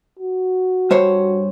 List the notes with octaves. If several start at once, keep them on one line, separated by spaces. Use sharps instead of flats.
F#4
G2 C5 C#5